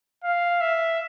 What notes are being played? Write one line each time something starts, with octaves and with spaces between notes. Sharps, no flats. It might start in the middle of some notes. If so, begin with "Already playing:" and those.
F5
E5